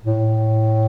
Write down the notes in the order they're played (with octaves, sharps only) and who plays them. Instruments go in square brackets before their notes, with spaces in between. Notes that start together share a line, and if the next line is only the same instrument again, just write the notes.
[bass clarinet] A2